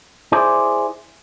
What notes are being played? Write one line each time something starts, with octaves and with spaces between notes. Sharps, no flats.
E4 G#4 C5 D5